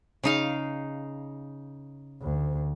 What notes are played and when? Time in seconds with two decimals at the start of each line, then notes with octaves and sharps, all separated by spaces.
0.23 C#3 D#4 F5
2.22 D2